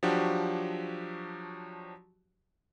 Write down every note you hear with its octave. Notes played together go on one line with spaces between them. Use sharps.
F3 F#3 D4 F#4 G4